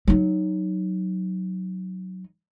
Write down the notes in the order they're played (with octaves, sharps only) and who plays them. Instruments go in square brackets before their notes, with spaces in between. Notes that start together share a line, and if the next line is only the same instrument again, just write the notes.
[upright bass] F#3 D#4